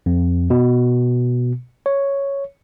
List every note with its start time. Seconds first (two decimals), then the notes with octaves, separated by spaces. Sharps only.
0.06 F2
0.50 B2
1.86 C#5